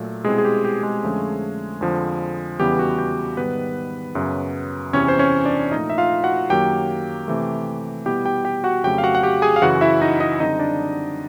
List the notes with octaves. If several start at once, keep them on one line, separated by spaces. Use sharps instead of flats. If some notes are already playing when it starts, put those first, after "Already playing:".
Already playing: A#2 F#3 A3
B2 G3 G#3 C4 E4 G#4
G#4
G4
G4
G#3 G#4
F2 D3 F3 A3 C#4
F2 D3 F3
E2 C#3 E3 G3 B3 G4
F#4
G4
G#2 D#3 G3 B3 B4
F#2 C#3 F#3
E2 C3 E3 C#4 C#5
C5
C#4 C#5
D4 D5
A#2 F3 A3 D#4 D#5
E5
F4 F5
F#4 F#5
F#2 D#3 F#3 A#3 G4 G5
C3 E3 A3
B2 G3 B3 E4 G4 G5
G4 G5
G4 G5
F#4 F#5
F2 C#3 F#3 A3 G4 G5
F5
F#4 F#5
F#5
G4 G5
G#4 G#5
F5
F#2 C#3 E3 F#4 F#5
E4 E5
D#4 D#5
D#4 D#5
F#2 D3 G3 C4 D#4 D#5
D4 D5